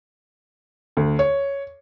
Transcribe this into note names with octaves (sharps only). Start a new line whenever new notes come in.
D2
C#5